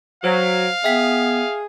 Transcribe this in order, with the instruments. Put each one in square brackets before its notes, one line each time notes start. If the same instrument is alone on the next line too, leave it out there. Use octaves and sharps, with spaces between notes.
[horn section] F#3 [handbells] C5 [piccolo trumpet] F5
[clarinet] B3 [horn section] G#4 [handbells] E5 G5 B6